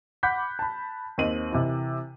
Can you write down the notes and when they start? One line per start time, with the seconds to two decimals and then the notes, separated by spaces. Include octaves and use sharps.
0.23 F#5 B5 D6 F#6 G6 B6
0.59 A5 B5
1.18 D#2 C4 D#5 D#7 F#7
1.52 C3 E3